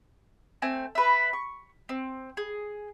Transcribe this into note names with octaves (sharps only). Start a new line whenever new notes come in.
A3 C4 G#5
B4 E5
C#6
C4
G#4